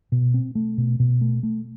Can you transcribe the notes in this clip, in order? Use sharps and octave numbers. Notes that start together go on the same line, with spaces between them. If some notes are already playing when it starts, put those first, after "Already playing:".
B2
C4
A3
B2
B2
A3
A3